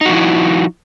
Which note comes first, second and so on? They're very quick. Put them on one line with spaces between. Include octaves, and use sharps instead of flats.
D#4 F#4 F3 E4